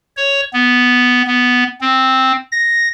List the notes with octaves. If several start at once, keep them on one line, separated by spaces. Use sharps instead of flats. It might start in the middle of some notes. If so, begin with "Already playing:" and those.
C#5
B3
B3
C4
A#6